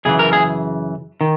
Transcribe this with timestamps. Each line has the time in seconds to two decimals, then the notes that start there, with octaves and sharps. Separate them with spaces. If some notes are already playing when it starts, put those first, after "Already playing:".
0.05 F#2 C#3 E3 G#4
0.19 A#4
0.33 G#4
1.21 D#3